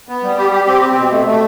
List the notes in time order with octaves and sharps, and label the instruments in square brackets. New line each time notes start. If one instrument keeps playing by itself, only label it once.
[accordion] B3
G3
G4
G4
C4
C4
B2
A3
A3